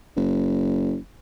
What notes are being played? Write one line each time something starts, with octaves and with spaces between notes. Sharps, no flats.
F#1